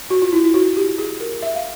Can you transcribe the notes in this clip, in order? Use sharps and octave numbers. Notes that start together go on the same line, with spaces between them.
F#4
F4
E4
E4
F#4
G4
G#4
A#4
E5
F5